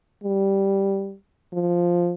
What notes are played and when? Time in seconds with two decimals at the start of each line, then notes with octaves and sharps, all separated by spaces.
0.24 G3
1.53 F3